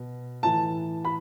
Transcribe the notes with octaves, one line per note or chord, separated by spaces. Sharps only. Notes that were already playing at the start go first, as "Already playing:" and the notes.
Already playing: B2
A2 E3 A5
B5